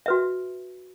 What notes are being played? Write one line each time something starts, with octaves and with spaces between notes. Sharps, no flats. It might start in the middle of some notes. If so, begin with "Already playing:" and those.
F#4 B4 E5